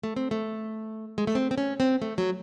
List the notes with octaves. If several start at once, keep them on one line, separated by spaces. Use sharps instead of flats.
A3
C4
A3
G#3
A3
C4
C4
C#4
C4
A3
F#3